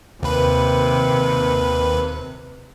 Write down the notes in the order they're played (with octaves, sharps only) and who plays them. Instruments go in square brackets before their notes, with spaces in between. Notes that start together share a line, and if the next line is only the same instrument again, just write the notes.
[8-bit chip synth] D#2 B4 [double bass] C3